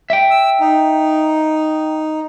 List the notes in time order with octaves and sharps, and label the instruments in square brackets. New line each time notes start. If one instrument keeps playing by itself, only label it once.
[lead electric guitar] E5 G5
[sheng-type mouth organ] E6
D#4